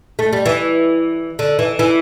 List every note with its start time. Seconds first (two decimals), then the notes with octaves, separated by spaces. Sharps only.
0.19 A3
0.33 G3
0.46 E3
1.39 D3
1.59 E3
1.79 E3